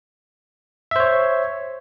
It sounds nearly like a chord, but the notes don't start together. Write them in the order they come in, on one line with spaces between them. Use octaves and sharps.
E5 C5 C#5